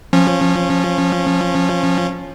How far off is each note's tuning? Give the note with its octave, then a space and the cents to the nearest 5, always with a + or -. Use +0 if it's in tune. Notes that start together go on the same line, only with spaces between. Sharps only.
F3 +0 C#4 -20